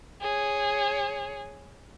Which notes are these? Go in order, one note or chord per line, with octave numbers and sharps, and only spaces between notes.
G#4 C#5